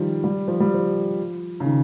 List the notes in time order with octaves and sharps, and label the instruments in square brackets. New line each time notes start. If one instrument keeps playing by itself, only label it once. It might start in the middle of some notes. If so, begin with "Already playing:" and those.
Already playing: [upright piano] D#3 F3 G3
G3
F3
G3
F3
C#3
D#3